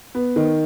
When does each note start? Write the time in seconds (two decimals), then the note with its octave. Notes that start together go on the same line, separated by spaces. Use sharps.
0.15 B3
0.36 D#3